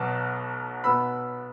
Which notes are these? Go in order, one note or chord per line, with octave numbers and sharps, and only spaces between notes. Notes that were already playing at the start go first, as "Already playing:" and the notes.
Already playing: B1 B2 F#3 B3 A5
B2 B3 B5 E6